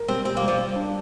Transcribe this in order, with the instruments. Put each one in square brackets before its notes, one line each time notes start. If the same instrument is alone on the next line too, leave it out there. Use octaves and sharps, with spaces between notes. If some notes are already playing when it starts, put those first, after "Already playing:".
Already playing: [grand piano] A#4
[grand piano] G3 [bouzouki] C4
[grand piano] G3 [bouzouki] C4
[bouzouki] A#3
[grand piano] G3
[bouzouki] F3
[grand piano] G3
D4